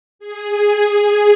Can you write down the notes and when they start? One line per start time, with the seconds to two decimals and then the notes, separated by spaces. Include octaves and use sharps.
0.19 G#4